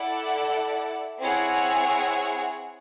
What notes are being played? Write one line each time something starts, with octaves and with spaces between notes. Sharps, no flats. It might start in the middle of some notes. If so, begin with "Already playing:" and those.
Already playing: E4 A4 D5 F#5
C4 E4 G#4 C#5 F#5